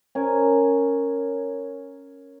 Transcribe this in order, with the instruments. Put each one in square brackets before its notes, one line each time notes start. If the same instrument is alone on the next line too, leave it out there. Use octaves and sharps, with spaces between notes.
[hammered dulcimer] C#4 A#4 G#5